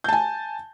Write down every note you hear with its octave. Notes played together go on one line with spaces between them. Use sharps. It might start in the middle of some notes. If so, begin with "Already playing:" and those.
G#5 A5 G6